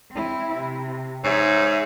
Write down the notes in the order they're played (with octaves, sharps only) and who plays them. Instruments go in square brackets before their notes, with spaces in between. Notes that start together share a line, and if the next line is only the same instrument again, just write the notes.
[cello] C4 E4
C3
[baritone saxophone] G#2 [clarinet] C#5 [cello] E5